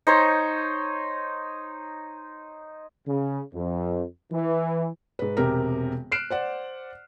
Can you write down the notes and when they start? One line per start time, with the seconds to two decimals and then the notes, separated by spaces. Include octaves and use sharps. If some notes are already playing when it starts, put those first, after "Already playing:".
0.07 D#4 C5 C#5
3.07 C#3
3.54 F2
4.32 E3
5.19 G#2 B4
5.37 E1 C3 G4 A#4
6.12 F6 F#6 C7 D7 E7
6.30 C5 D5 F#5